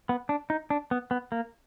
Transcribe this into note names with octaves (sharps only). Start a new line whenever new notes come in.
B3
D4
D#4
D4
B3
B3
A#3